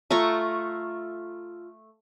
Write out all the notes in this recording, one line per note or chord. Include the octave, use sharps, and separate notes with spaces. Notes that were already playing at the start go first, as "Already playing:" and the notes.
A3 F4 A#5 C#6